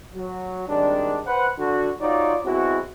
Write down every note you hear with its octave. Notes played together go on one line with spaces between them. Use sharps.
F#3
G#1 D#3 G3 G#3 D4
B4 C5 F#5
D3 F#4
D#4 F4 F#4 C#5 D5
B2 G#3 C4 E4 F#4